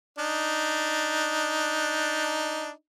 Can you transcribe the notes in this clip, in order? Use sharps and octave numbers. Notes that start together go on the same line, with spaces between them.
D4 D#4